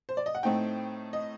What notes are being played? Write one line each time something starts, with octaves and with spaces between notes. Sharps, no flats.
C5
D5
D#5
F#5
A2 A3 C4 D#4 G5
D#5